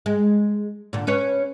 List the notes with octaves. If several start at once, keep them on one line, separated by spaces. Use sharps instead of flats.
G#3
A#2 D3
C#4 B4 C#5